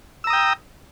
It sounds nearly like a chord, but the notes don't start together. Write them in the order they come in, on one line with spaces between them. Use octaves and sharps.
E6 A#5 D#6 G5